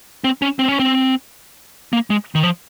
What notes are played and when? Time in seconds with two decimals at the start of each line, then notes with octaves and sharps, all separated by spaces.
0.24 C4
0.42 C#4
0.59 C4
0.68 C#4
0.80 C4
1.93 A#3
2.10 G#3
2.35 D#3
2.43 F3